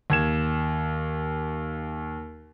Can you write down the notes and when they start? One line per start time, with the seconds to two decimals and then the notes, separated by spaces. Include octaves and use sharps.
0.10 D#2 G#6 E7